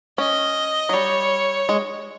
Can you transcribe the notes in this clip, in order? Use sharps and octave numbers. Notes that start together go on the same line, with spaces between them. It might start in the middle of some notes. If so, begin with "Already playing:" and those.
C#4 D#5
F#3
G3 C#5
G#3